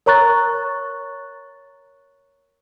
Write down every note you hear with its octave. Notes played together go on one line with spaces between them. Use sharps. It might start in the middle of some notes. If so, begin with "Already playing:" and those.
A#4 C#5 A#5 C#6 F#6 A6